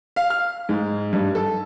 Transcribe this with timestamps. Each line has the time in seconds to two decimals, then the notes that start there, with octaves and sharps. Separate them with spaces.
0.16 F5
0.30 F6
0.69 G#2
1.13 G2
1.35 A4